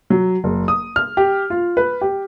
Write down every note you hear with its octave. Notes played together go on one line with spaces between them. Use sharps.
F#3
F#1
D#6
F6
G4
F4
B4
G4